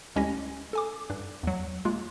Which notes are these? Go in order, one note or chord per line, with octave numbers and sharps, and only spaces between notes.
D2 G#3 C#4 E4 G4 A#6
A4 G#5 D6
G2 D4
E2 F#3
G#3 A#3 F4